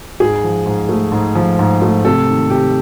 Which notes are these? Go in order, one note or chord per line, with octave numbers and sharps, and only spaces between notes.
G#2 G#4
F3
G#2
A3
G#2
F3
G#2
A3
C3 A4
D#3
C3 G4